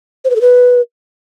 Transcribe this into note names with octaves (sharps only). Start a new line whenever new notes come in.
C5
B4
A4
B4